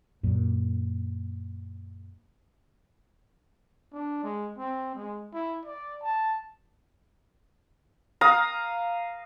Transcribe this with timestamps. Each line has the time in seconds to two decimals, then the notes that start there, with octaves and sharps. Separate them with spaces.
0.23 F#2 A#2
3.93 D4
4.23 G#3
4.58 C4
4.95 G#3
5.33 E4
5.65 D5
6.02 A5
8.21 F5 A#5 D#6